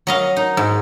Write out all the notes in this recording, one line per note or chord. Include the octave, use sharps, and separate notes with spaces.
F#3 D#5 F5
D#4
G#2